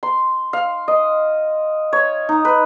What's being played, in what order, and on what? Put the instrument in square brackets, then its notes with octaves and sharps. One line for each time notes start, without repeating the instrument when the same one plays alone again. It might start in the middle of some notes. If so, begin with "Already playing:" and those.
[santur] C6
F5
D#5
C#5
D#4
B4